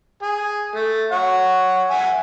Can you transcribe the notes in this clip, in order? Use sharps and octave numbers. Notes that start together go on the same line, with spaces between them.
G#4
A3
C#5 F#5
E5 F#5 G#5